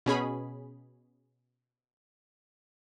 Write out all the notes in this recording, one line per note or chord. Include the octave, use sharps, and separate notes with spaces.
B2 C#4 G#4 B5